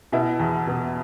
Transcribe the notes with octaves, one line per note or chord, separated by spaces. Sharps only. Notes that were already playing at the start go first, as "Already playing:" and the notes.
B2 E4
E2
B2